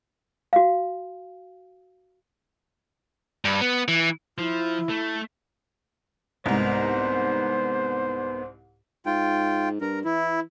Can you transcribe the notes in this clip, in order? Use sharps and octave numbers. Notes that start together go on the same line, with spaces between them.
F#4 F5
G2
B3
E3
F3 E4
A3
C2 G#2 B3 D#4 A#4 C5
G#2 F4 G5
G2 A#4
E3 E4